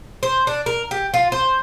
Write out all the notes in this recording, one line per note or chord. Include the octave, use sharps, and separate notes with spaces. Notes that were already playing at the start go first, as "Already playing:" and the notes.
C5
D4
A#4
G4
F4
C5